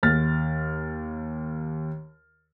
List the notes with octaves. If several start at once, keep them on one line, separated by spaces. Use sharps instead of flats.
D#2 F6 A6